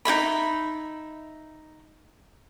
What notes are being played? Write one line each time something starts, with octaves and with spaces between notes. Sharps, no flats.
D#4 G#4 E5 B5